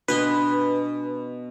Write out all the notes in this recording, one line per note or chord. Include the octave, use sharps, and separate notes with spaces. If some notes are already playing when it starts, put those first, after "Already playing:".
B2 B3 D4 B4 C6